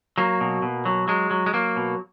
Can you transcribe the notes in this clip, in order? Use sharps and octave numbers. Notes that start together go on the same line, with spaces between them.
F#3 A#3
B2
B2
F#3
F#3 G#3
F#3
G#3
F#3 A#3
B2